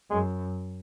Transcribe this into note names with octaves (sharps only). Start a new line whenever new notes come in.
F#2 G#3